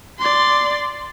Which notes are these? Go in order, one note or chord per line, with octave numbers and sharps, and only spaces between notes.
D5 C6